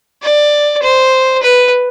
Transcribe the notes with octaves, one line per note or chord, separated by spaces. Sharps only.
D5
C5
B4